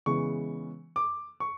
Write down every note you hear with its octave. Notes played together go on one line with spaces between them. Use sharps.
C#3 E3 G#3 B3 C#6
D6
C#6